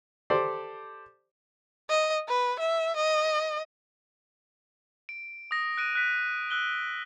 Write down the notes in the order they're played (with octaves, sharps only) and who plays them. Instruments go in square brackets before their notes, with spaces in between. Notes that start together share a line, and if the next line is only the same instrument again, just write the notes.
[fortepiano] G4 A4 C5 D5
[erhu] D#5
B4
E5
D#5
[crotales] D7
D#6 A#6
F#6 D7 D#7
F#6 B6 D#7
E6 F#6 G7